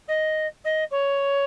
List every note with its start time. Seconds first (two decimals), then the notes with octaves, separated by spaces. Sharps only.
0.08 D#5
0.64 D#5
0.91 C#5